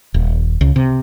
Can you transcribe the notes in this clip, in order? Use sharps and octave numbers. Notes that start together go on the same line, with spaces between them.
D#1
C#2
C3